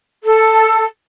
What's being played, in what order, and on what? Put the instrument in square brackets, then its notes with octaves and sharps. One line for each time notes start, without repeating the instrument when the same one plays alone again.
[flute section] A4